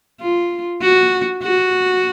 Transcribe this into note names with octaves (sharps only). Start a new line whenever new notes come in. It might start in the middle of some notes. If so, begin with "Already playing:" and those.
F4
F#4
F#4